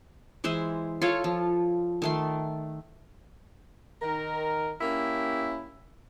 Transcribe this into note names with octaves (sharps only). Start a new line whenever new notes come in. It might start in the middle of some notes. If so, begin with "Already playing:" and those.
E3 G#3 C5 E5
F4 A4 C#5
F3
D#3 A3 C6
D#3 A#4
A#3 C#4 E4 G4